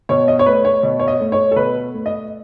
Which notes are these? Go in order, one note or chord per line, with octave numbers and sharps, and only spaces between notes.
B2 C#5
D#5
C#5
A3 B4
C#5
B2
C#5
D#5
A3
C#5
A4
B2 B4
A3
D#5